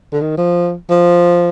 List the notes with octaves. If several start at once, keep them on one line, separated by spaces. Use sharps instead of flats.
D3
D#3
F3
F3